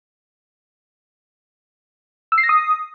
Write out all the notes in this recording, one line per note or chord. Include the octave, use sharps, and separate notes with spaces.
E6
C7
A#6
D#6